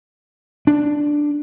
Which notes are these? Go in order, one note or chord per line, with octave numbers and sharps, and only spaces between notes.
D4